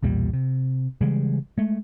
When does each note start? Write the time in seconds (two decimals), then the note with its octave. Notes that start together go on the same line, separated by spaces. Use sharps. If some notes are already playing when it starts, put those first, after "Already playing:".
0.02 B1 E2 A#2 G3
0.33 C3
1.01 C#3 E3 G3 G#3
1.58 G#3 A3